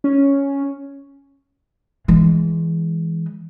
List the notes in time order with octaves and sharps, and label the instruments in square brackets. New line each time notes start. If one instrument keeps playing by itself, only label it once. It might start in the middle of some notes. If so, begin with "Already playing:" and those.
[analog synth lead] C#4
[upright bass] E3 G#3